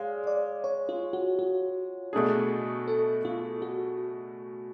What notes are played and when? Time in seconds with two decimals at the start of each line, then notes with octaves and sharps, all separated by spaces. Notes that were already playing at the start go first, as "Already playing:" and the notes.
Already playing: G#3 C#5 D5 F5
0.27 D5
0.64 C#5
0.89 F4
1.13 F#4
1.39 F#4
2.13 B2 A3 D4 G#4
2.88 A4
3.25 F4
3.62 F#4